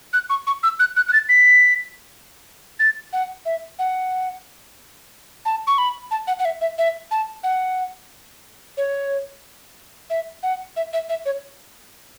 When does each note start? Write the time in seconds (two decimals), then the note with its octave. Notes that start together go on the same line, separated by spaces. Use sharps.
0.13 F#6
0.30 C#6
0.47 C#6
0.63 E6
0.80 F#6
0.96 F#6
1.08 F#6
1.13 A6
1.29 B6
2.80 A6
3.13 F#5
3.46 E5
3.79 F#5
5.45 A5
5.67 C#6
5.78 B5
6.11 A5
6.27 F#5
6.39 F#5
6.45 E5
6.61 E5
6.78 E5
7.11 A5
7.44 F#5
8.77 C#5
10.10 E5
10.43 F#5
10.77 E5
10.93 E5
11.09 E5
11.26 C#5